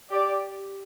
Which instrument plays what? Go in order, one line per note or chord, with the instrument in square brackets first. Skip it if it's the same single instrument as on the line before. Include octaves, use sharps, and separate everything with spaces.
[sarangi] G4 [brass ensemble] D5